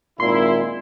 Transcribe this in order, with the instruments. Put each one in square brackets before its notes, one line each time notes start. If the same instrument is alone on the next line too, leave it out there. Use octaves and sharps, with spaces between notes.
[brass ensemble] G#1 A#2 E4 [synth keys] C6